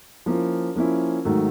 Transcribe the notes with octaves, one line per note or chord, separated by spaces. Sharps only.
F3 A#3 C#4 E4
F3 A#3 C#4 E4
G#2 D#3 F#3 A3